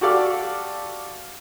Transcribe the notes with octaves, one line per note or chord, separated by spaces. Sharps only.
F#4 G4 A4 D5 F5